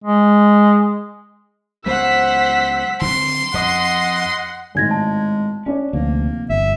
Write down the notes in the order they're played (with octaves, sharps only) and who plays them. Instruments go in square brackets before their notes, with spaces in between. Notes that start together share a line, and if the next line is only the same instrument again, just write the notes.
[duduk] G#3
[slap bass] C#2 F#3 B3 [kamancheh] C5 F#5 [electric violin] E6 B6
[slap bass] D3 F#3 C4 [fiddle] C6
[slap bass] F2 [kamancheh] D#5 [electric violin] F#5
[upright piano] G#1 A2 [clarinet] G#3 [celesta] G#5 G#6 A#6
[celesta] A5
[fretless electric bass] C#4 [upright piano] D4 C#5 D5
[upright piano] F1 [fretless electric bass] D2 [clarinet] A#3
[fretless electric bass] G1 [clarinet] E5